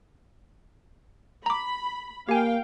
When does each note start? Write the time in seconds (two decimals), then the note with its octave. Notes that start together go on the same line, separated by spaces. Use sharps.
1.46 A#5 B5 D6
2.29 A#3 G4 F5 G5 G#5